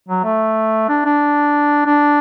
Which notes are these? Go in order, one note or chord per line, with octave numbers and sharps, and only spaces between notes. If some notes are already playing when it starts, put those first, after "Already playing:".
F#3
A3
D4
D4
D4